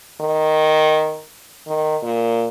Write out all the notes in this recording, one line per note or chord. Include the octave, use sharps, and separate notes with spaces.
D#3
D#3
A#2